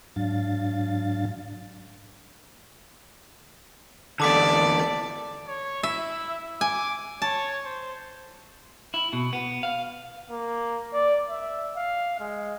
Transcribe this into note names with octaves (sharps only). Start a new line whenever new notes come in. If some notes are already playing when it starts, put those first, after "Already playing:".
G#2 F#3 D4 F5 A6
E2 D3 A4 D5 A5 D6 B6
C#5
E4 E5
G#5 D6
C#5 A5
C5
E4
B2
B3
F5
A#3
D5
E5
F5
G#3